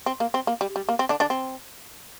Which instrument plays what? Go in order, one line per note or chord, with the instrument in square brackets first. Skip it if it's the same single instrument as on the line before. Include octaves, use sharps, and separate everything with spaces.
[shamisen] C4
A#3
C4
A#3
G3
G3
A#3
C4
D3 D4
D3 D4
C4